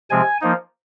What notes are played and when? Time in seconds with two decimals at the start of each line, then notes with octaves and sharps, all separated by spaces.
0.10 C3 F3 G#3 C4 G#5
0.41 F3 A#3 D#4